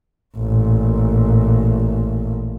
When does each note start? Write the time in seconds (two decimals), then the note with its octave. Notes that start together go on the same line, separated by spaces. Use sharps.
0.37 A1 A#2